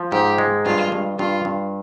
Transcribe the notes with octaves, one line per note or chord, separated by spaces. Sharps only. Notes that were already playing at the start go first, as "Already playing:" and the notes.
Already playing: F3
G#2 G4
G#3
G2 F4
G2
G2 F4
G2